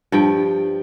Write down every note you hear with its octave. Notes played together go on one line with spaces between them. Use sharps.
G2 F3 G5